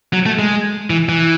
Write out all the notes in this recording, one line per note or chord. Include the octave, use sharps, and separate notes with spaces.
F#3
A3
G#3
E3
E3